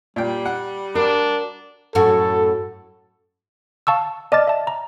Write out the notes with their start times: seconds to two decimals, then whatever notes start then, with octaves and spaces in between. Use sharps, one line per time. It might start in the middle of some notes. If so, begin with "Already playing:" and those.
0.16 A#2 G3 G5
0.46 F#5
0.95 D4 F#4 A#4
1.95 F#2 A2 F#4 A4
3.87 F5 A5 C#6 E6
4.32 D5 D#5 A5 D6 F6 A6
4.48 E5 A5
4.67 A#5